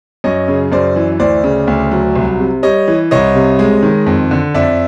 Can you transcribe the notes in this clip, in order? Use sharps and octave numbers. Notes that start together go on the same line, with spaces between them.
F#2 C#5 D#5
C#3
F#2 C5 D5
E3
D2 C5 D5
C#3
D2
F#3
C2
C3
G3 C#5 D#5
E3
C2 C#5 D#5
C3
G#3
D#3
F2
D3
F2 D5 E5